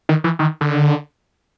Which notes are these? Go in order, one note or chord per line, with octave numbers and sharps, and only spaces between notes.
D#3
E3
D#3
D3